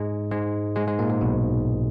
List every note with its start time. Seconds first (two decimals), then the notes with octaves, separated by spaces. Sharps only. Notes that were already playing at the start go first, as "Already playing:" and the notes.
Already playing: G#2 G#3
0.31 G#2 G#3
0.76 G#2 G#3
0.87 G#2 G#3
0.99 A#2 A#3
1.10 G#2 G#3
1.21 B1 B2